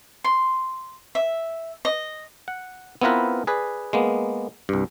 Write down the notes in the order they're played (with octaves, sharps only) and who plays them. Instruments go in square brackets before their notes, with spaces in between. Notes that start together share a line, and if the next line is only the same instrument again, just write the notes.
[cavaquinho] C6
E5
D#5
[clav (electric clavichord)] F#5
B3 C4 E4 F4 A#4 B4
G#4 B4 D5
G#3 A#3 B3
C2 G2